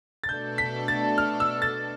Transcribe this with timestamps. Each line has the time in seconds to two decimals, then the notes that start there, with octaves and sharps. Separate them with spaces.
0.24 A6
0.29 B2 A3 D4 A4 G6
0.58 B6
0.88 A6
1.18 F6
1.40 E6
1.62 A6